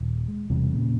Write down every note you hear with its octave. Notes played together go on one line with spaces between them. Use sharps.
D#1
G#3
E1 E2 C3 G3
A#2 C#3